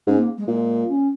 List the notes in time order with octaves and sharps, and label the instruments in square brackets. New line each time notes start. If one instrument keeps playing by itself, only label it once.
[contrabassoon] G#2 [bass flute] C#4
[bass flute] A#3
G#3
[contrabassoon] A#2 [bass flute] G#3
[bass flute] C#4